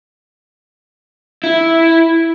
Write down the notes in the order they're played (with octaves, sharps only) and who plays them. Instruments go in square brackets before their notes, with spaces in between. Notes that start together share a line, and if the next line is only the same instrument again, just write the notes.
[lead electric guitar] E4